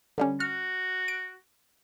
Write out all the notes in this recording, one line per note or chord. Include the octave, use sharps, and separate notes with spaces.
D3 G3 C#4
F#4 F6
D7